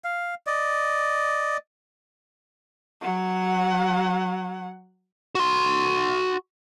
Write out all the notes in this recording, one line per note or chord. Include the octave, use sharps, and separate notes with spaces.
F5
D5 D#5
F#3 F#5
F#4 C6